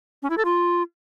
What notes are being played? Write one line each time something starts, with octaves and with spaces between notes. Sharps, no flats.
C#4
E4
A4
F4